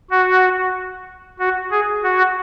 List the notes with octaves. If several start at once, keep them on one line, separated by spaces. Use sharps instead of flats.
F#4
F#4
G#4
F#4